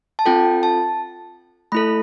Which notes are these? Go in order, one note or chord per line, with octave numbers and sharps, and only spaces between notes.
A5
C4 F4 A4 G5
A5
A3 E4 A4 B5